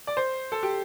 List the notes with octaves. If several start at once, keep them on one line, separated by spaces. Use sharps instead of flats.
D5
C5
A4
G4